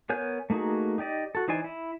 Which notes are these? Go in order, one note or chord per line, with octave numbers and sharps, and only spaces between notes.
B3 A#4 C#5 G#5 G6
A3 A#3 D#4 F#4 G#4
D#4 G4 D5 D#5
F#4 A4
E3 D#4 C5 D5 G#5
E4